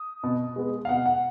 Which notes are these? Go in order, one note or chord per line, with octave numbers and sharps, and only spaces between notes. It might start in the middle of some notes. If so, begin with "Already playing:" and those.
Already playing: D#6
B2
G#3 B3
F5
B2 F#5
F#5